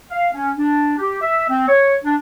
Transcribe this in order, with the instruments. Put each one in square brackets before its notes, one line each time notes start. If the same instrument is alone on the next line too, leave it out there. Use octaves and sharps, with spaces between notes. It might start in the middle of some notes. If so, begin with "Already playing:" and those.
[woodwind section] F5
C#4
D4
G4
E5
C4
C#5
D4